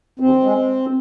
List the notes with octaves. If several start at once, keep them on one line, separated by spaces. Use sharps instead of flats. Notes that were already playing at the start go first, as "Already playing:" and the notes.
D#2 C4
G#3